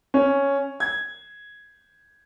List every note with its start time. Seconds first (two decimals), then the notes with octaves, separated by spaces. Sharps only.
0.14 C#4
0.80 G#6